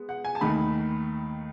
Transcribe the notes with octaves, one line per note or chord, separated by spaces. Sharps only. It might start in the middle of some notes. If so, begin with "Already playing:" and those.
Already playing: G#3 B3
F#5
G#5
A5
D#2 D#3 A3 B5